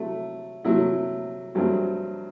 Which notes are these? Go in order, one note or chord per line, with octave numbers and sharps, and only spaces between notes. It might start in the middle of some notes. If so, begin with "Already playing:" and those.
Already playing: C3 F#3 A3 E4
C3 F#3 A3 E4
G2 F#3 A3 C4